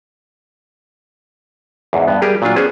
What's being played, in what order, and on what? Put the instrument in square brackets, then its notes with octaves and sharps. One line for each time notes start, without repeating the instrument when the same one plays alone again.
[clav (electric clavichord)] E2 G#2
G2 B3
G3 G4 G#4 A#4
A#2 F#3 D4 F4
B3 C#4 G#4 C5